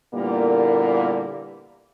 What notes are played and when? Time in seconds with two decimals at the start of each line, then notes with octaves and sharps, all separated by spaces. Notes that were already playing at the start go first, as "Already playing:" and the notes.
0.14 A#2 D3 G3 A#3 B3 E4